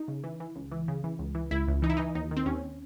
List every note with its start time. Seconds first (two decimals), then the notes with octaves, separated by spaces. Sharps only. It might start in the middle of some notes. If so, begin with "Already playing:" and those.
Already playing: D#4
0.08 C#3
0.24 E3
0.40 E3
0.56 C#2
0.71 E3
0.88 C#3
1.04 E3
1.19 C#2
1.35 E3
1.51 C#2 E4
1.68 C#2
1.82 E3 D#4
1.90 E4
1.97 E3 D#4
2.15 D#2 D#4
2.31 D#3
2.37 C4
2.46 D#2 C#4